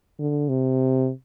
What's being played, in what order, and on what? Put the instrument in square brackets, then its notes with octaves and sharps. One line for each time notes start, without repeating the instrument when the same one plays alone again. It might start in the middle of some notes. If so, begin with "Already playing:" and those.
[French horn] D3
C3